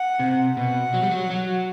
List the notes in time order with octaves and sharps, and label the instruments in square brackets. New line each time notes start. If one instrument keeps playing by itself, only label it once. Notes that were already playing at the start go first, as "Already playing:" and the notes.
Already playing: [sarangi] F#5
[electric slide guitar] C3
[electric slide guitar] B2 [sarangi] F#5
[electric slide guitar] F#3
G3
F#3
F#3